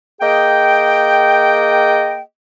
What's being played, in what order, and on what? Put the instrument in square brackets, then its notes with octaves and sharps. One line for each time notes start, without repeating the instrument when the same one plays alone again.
[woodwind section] A#3 G#4 D#5 G5